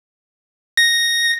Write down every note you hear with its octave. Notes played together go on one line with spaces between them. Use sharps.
A#6